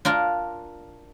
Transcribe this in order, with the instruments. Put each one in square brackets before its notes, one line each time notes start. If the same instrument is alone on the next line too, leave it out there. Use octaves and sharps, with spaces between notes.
[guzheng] D4 F4 A#4